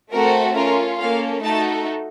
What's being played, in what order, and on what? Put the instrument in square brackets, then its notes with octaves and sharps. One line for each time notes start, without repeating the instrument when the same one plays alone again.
[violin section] A3 C4 F#4 A4 A#4
C#4 F4 A4 A#4
A#3 C#4 A4 F5
A3 D#4 F#4 A4 A5